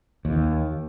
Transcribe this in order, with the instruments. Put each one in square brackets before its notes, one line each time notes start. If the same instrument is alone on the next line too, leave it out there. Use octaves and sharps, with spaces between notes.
[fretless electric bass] D#2